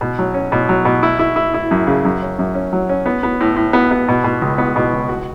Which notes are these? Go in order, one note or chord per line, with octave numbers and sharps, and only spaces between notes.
B2
F#3
C#4
B2
F#3
B2
E4
E4
E4
E4
F#2
C#3
F#2
C#4
F#2
C#4
F#3
C#4
B3
B3
A2
A2
B3
B3
B2
B2
C#2
B3
B2
C#2
F#4